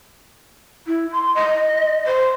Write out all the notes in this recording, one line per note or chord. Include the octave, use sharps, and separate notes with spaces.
E4
C6
D#5
C5